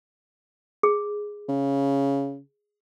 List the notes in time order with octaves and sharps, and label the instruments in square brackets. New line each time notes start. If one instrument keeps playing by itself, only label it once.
[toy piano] G#4
[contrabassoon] C#3